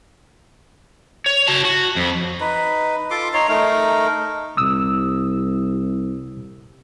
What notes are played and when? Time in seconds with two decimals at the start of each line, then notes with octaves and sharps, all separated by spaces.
1.26 C#5
1.48 F#4 A5
1.65 F#4
1.96 F2
2.41 D#4 B4
3.11 F4 A4 C6 D6
3.33 D#4 C#5 C6
3.49 A3 D#4 A#4
4.57 C2 D#6 E6